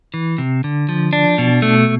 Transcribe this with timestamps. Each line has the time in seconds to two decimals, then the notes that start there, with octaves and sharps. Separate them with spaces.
0.14 E3
0.38 C3
0.64 D3
0.89 F3
1.13 D4
1.38 B2
1.62 A3